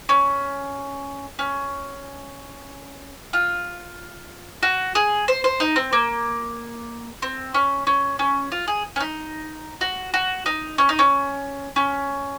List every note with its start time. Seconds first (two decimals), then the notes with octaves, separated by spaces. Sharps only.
0.09 C#4
1.39 C#4
3.33 F4
4.63 F#4
4.95 G#4
5.28 C5
5.44 C5
5.60 D#4
5.76 C4
5.93 A#3
7.22 C4
7.54 C#4
7.87 C#4
8.19 C#4
8.52 F4
8.68 G#4
8.96 C#4
9.00 D#4
9.81 F#4
10.14 F#4
10.46 D#4
10.78 C#4
10.89 D#4
10.99 C#4
11.76 C#4